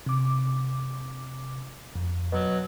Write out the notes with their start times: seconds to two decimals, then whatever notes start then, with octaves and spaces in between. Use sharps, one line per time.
0.06 C3 D6
1.95 F2
2.32 B2 F#3